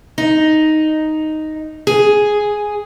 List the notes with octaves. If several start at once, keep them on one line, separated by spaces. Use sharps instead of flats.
D#4
G#4